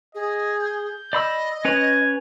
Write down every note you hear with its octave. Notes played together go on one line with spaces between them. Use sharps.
G#4 D#5
G6
D5 D#5 B5 E6
C#4 B4 C#5 G#6